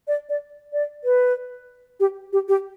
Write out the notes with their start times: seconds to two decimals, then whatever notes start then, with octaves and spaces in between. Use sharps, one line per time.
0.08 D5
0.29 D5
0.73 D5
1.04 B4
2.00 G4
2.33 G4
2.48 G4